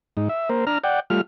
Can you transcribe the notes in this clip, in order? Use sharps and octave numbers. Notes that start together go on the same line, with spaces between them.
G#2 D#4
E5
A#3 A#4 C5
D4 A#5 F6
D5 F#5 G5
G3 A3 F4 F6